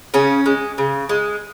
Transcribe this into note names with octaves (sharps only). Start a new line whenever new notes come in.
C#3 C#4
G#3
C#3
G#3